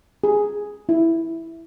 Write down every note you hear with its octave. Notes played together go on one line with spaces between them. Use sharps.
G#4
E4